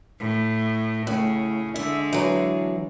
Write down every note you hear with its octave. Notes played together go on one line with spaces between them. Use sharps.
A2
A2 C#3
D3 G#3 E5
E3 F#3